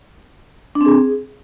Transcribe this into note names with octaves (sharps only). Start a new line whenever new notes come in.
D4
C4
G#4